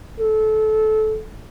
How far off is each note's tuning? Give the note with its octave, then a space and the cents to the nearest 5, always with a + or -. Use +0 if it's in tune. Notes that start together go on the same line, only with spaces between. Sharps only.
A4 -20